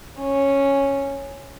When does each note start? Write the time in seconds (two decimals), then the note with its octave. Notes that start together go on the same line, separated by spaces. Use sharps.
0.20 C#4